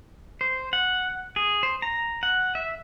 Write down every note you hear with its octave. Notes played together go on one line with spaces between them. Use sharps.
C5
F#5
G#4
C5
A#5
F#5
E5